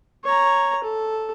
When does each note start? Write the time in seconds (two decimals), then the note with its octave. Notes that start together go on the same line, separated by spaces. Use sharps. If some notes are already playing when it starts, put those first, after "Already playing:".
0.25 C#5 A#5
0.84 A4